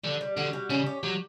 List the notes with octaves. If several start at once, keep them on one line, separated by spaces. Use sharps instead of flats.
D3 G3
G3
D3 F#4
G3
C#3 C#4
G4
F#3 G4